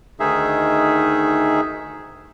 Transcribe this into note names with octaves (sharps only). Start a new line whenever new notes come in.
D2 D#3 D#4 G#4 E5